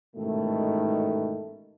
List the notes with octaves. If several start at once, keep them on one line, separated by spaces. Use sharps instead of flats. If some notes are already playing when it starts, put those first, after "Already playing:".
A1 G#2 B2 D#3 A3